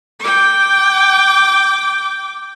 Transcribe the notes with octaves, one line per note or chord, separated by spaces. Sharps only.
G5 D6